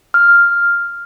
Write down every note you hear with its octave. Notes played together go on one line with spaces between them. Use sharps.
F6